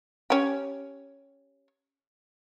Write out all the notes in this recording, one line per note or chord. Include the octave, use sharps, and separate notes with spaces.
C#4 G4